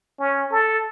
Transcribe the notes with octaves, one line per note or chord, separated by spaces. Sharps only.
C#4
A4